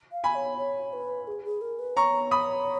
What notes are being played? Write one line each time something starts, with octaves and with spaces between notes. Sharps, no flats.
F5
G#5 B5
C#5
C#5
B4
G#4
G#4
A#4
B4
C#5 A#5 C#6
B5 D#6